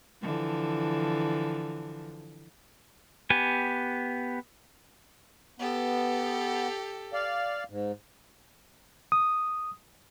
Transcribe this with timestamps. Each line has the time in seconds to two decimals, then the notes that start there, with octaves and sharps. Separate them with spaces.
0.22 D3 E3 F3
3.30 B3 G4 G#5
5.60 B3 G4 A4
7.13 D5 F5
7.70 G#2
9.12 D#6